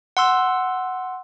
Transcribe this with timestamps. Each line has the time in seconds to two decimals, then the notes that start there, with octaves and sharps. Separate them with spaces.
0.17 F#5 C6 E6